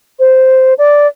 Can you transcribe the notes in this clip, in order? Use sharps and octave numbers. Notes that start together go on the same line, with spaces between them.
C5
D5